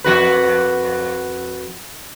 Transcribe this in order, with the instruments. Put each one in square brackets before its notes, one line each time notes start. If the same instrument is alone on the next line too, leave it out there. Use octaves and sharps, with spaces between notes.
[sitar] F2 F#4 B4